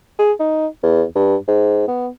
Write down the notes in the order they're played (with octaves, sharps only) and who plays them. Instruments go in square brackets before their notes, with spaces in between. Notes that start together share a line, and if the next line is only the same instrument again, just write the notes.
[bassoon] G#4
D#4
E2
G2
G#2
B3